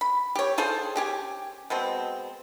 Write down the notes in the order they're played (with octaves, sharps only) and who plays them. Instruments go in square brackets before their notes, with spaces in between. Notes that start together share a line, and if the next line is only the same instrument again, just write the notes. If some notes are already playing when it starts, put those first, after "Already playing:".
[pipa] B5
G4 C#5
F4 G#4 A4 C5
C#4 G4 G#5
B2 G#3 C4